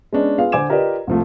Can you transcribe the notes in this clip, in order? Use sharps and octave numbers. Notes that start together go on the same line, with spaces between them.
G#3 B3 C#4 D4
B3 F4 G#4 F5
D3 C5 G#5 D6 G#6 E7
F4 G4 A#4 B4 D5 D#5
C2 F3 A3